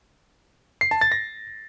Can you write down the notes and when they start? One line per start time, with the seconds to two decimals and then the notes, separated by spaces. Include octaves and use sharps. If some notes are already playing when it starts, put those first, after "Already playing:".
0.81 C7
0.91 A5
1.01 A6
1.12 A#6